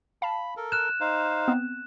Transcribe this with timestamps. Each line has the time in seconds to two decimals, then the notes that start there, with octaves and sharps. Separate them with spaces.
0.22 F5 A5 B5
0.57 A4 A#4
0.72 F6 F#6 E7
1.01 D#4 C5 F5
1.48 B3 C4